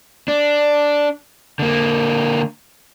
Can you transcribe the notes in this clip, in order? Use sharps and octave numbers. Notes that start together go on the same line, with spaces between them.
D4
D3 A#3